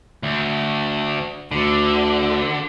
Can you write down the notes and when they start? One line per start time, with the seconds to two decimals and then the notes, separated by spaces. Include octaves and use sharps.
0.23 D2
1.52 D2 D3